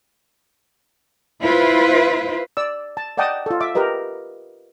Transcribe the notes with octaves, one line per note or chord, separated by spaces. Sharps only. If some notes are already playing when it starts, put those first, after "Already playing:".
E4 F4 B4 C5
D5 E6
A5
D5 D#5 F#5 G5 A5 D#6
F4 A4
E5 D6
G4 A#4 B4 D#5